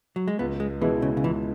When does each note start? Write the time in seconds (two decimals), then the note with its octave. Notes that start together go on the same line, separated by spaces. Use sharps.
0.16 F#3
0.28 G#3
0.39 C#2 B3
0.60 G#3
0.81 B2 E3 G#3 B3 E4
1.02 C#3
1.17 C#3
1.24 C#2 E3